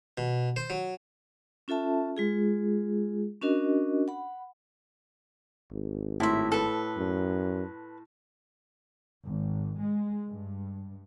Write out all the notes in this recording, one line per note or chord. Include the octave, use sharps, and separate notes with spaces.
B2
C5
F#3
C#4 F4 A4 E5 A5
G#3 F4 G#4
C#4 D4 F#4 A#4 D#5
F#5 B5
G#1
A2 E4 E5 C6
A4 B4
F#2
G#1
G#3
G2